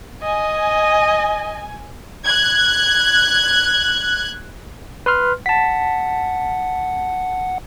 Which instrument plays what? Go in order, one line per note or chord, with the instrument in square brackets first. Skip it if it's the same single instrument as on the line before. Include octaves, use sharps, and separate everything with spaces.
[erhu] D#5 [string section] G#5
[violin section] F#6 G#6
[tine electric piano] B4 C6 F6
[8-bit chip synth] F#5 [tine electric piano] A5 B6